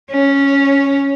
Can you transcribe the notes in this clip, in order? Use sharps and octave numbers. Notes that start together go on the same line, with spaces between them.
C#4